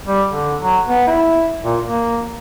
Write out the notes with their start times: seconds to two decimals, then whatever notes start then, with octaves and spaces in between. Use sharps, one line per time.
0.06 G3
0.29 D3
0.61 F#3
0.88 B3
1.07 E4
1.64 A#2
1.86 A#3